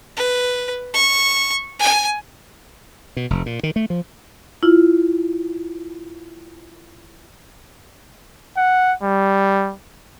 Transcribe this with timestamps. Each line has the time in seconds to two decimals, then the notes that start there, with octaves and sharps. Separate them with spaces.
0.17 B4
0.94 C#6
1.80 G#5
3.17 B2
3.30 F1
3.46 A#2
3.63 D#3
3.76 A3
3.90 F3
4.63 E4 F4
8.57 F#5
9.02 G3